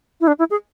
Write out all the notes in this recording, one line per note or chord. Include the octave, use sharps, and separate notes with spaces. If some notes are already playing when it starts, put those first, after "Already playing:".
E4
D4
E4
G#4